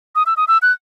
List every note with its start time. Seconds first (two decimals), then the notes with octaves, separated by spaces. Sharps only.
0.15 D#6
0.26 E6
0.37 D#6
0.48 E6
0.62 F#6